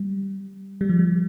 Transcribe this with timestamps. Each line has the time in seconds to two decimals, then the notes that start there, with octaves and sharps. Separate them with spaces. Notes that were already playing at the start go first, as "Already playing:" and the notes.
Already playing: G3
0.81 G3
0.89 F3
0.99 G3